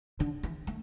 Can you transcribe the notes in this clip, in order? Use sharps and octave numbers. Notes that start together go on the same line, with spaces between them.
D3
E3
A3